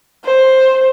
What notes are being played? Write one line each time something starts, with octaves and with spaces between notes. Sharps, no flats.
C5